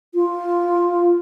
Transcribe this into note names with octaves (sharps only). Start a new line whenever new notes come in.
F4